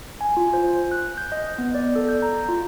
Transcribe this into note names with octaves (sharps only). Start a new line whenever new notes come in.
G#5
F4
C5
F#6
G6
D#5
B3
D5
A4
G6
A#5
F4